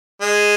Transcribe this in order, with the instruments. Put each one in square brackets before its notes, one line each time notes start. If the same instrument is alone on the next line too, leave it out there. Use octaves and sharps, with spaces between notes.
[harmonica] G#3